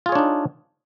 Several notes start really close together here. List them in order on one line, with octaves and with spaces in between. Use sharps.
F4 G#4 C#5 D4 D#4